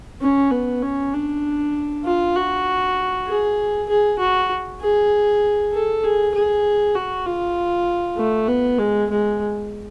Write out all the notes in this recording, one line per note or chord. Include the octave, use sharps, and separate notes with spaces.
C#4
B3
C#4
D4
F4
F#4
G#4
G#4
F#4
G#4
A4
G#4
G#4
F#4
F4
A3
B3
G#3
G#3